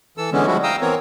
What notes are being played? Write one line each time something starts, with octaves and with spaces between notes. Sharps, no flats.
E3 A4 E6
D3 E3 G#3 B3 C#4
F3 G3 G#3 E4 F#4
F5 G5 A#5 D#6 E6
E3 B3 C4 A#4 C#5